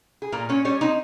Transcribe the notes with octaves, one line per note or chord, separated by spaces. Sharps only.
G#4
A#2 A#3 A#4
A#2 C#4 C#5
G3 C#4 C#5
C4 D#4 D#5